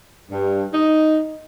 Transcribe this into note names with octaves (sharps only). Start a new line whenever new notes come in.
G2
D#4